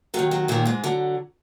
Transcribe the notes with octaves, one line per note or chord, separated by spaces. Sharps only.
D#2 D#3 F#3
F#3
D#2 A#2 D#3 A#3
G#2 G#3
D3 F#3